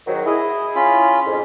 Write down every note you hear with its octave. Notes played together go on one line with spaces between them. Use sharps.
G#2 D#3 F#3
E4 G#4 D#5
C#4 F4 B5
F2 G#2